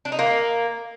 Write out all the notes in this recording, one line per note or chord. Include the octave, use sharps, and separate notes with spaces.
D4
D#4
A#3